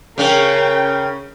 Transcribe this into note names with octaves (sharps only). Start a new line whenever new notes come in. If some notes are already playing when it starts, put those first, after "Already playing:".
C#3 C#4 A#4 G5